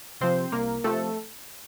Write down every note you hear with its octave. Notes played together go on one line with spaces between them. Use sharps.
C3 F3 C4 C5
C2 A#3 A#4
C3 F3 A3 A4